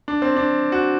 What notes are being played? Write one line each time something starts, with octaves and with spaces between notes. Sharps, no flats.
D4
C4
D4
F#4